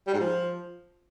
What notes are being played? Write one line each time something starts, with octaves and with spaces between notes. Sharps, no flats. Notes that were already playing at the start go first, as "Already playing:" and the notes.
G3
G#2
F3